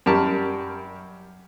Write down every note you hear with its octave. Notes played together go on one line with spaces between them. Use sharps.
F#2 G3 G4 A#4 A5